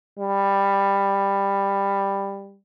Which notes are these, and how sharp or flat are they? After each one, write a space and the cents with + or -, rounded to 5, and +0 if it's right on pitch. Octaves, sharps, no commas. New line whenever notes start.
G3 +15